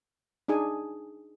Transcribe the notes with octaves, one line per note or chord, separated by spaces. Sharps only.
D4 D#4 G#4 G#5